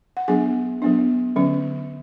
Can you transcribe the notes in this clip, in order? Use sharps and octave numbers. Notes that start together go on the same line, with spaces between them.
F#5
F#3 B3 D4 G#4 G#5
F#3 B3 D4
D3 F#3 C#4